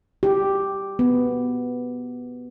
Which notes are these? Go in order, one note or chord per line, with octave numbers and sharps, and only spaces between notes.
G4
B3